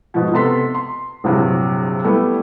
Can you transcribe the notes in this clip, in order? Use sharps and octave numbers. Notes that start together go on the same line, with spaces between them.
G#2 B2 F3
C3 B3 A4 C6 B6
C6
A#1 G2 C3 E3 F#3
G3 A3 B3 E4